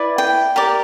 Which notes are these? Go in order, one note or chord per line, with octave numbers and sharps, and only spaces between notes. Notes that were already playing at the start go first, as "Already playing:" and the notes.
Already playing: E4 B4 D5
G5
G4 A#4 D5